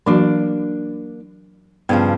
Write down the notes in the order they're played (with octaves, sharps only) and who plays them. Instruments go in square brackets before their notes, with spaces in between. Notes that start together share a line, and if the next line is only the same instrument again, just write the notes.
[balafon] E3 F#3 F#4 [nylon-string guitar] A#3 D4
[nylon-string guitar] G2 C#3 F3 [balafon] B3